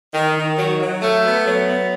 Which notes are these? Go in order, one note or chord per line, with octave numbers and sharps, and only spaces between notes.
D#3
D#3
F#3
F#3
A3
B3
F#3
B3